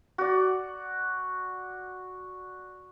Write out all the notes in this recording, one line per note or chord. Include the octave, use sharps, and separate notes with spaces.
F#4 D5